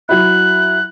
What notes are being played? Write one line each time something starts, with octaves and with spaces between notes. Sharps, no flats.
F#3 E4 F#6